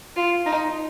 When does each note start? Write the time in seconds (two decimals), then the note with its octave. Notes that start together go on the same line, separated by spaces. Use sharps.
0.16 F4
0.46 D#4